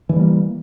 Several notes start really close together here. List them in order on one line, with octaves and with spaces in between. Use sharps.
E3 F#3 G3 A#3